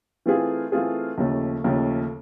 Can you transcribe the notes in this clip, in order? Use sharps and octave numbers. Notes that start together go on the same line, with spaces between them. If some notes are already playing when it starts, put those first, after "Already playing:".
E3 A3 C4 F4 G#4
E3 A3 C4 F4 G#4
D#2 C#3 F3 A3
D#2 C#3 F3 A3